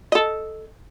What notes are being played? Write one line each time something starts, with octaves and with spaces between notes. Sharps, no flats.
A4 D#5